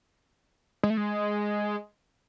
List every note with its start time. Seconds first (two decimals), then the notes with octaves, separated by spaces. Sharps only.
0.83 G#3
0.90 A3
0.97 G#3